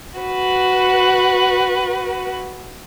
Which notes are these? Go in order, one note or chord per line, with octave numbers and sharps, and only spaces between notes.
F#4 B4